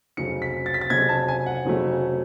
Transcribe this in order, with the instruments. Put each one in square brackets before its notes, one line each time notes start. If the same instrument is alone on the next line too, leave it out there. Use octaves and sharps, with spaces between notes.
[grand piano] F1 F2 C#3 F#3 A3 C#7
B6
A6
B6
A6
F1 F2 C#3 F#3 A3 G#6
A5
G#5
F#5
F1 F2 C#3 F#3 A3